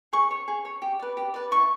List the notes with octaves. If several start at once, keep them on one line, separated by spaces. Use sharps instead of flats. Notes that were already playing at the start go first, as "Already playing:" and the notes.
G#4 C#6
C#5
G#4
C#5
G4
B4 D5
G4
B4 D5
E4 C#6